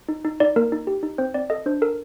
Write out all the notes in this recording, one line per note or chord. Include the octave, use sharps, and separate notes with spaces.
D#4
D#4
D#4 D5
A#3 A#4
D#4
G4
D#4
C4 C5
C4 D5
A4 D#5
D4 C5
A4 A#4